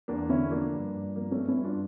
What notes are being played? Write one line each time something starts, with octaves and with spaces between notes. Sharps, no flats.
E2 A#3 D4
D3 C#4 E4
F3 A#3 D4
G2
G2
F3 A#3
A3 C#4
G2
C#4 E4
G2
D4 F4